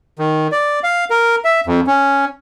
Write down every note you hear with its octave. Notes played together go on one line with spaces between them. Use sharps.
D#3
D5
F5
A#4
E5
F2
C#4